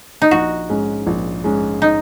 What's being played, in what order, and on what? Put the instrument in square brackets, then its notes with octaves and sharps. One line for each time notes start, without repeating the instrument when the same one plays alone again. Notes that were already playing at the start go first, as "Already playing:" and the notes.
[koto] D#4
[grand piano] A#1 [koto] F#4
[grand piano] G#2 G#3 C#4
A#1
G#2 G#3 C#4
[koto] D#4